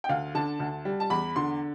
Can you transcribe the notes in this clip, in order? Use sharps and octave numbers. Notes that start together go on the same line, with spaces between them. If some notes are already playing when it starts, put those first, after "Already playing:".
G5
D2 F5
D3 A5
D2
G3
A5
E2 B5
D3 C6